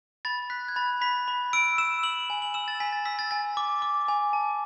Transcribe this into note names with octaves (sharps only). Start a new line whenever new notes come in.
B5 A6
F#6 B6
G#6
B5 A6
B5 B6
B5
E6 D7
E6 E7
E6 F#7
G#5
F#7
E6 E7
A6
G#5 B6
A6
E6 B6
A6
G#5 A6
D6
D6
G#5
A5